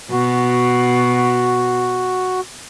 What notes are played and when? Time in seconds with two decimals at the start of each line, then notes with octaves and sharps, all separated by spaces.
0.11 B2 F#4